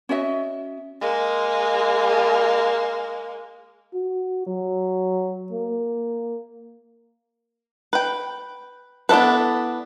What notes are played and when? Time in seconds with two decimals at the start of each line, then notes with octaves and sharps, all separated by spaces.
0.09 C#4 F#4 D#5 E5
1.01 G#3 A#3
3.94 F#4
4.47 F#3
5.52 A#3
7.93 B4 G5
9.09 B3 D4 E4 A4 B4